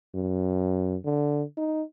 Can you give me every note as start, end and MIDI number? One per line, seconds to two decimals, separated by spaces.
0.15 0.96 42
1.05 1.43 50
1.57 1.82 63